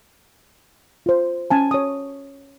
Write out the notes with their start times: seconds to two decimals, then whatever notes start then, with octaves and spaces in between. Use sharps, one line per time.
1.06 F4 C5
1.51 C#4 G#5 A5
1.71 C#5 D#6